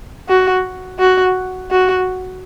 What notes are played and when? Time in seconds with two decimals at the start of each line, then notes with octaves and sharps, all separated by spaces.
0.29 F#4
0.99 F#4
1.71 F#4